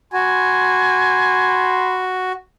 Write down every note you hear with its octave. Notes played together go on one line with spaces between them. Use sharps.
F#4 G#5 B5 C6